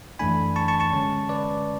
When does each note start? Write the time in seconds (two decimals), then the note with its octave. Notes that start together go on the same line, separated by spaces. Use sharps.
0.19 F#2 E3 A3 D4 G#5 B5
0.56 A5 C#6
0.68 A5 C#6
0.80 A5 C#6
0.93 D3 G#3 C#4
1.29 B4 D5